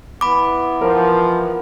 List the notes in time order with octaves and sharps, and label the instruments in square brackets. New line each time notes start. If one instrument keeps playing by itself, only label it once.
[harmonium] E3 B3 [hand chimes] B5 D6
[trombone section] F3 [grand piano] A#4